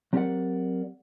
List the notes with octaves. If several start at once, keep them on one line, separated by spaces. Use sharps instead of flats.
F#3 C4 G4 A#4 D5 F#5